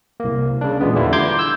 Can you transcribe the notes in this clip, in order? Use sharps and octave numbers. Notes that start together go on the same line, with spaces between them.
C2 A#3
C#3 D4
E2 A#2 G#3 B3
D3 E3 G3 E4 F4
A#5 C6 D6 G6 G#6
E6 G6